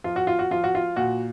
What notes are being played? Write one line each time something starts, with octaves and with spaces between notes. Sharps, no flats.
F3 F4
F#4
F4
F#4
F3 F4
F#4
F4
A#2 F#4